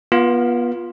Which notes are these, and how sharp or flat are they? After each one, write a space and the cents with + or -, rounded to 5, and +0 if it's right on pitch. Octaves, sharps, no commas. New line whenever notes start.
B3 -30 F4 +0